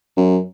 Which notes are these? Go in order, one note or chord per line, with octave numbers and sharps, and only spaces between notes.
F#2